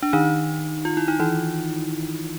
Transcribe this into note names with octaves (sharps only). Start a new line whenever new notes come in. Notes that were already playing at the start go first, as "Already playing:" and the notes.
D4
D#3 D#4
F4
E4
D#4
E3 E4